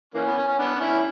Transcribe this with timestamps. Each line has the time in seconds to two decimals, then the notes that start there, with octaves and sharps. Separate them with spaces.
0.14 E3 A#3 C#4
0.26 B3
0.37 C#4
0.48 C#4
0.59 B3 D4
0.75 D4
0.80 C#4 E4